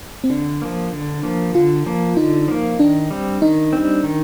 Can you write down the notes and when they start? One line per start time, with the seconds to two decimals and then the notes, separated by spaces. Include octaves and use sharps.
0.24 C4
0.30 D3 D4
0.62 F3 A#3
0.93 D3
1.23 F3 A#3
1.54 D3 F4
1.86 F3 A#3
2.17 D3 D#4
2.48 F3 A#3
2.80 D#3 D4
3.11 G3 C4
3.42 D#3 D#4
3.73 G3 C4
4.04 D#3